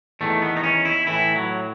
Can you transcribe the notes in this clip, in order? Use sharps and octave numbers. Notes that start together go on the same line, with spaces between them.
E2 D#3 A3
B3
D#4
C#4
E4
A2 E3 E4
F#3